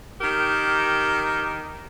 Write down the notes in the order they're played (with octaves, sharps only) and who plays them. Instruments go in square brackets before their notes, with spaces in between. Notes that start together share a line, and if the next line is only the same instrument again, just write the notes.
[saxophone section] D#3 G4 A#4